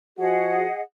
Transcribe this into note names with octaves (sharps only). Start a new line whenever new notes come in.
F3 F#4 G#4 D#5 F#5